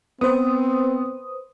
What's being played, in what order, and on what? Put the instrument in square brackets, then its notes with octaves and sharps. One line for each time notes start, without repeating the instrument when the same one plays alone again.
[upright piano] B3 [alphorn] C4 [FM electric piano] B4 C5 D#6